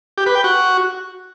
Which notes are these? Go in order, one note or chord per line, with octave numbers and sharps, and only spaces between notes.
G4
B4
G5
F#4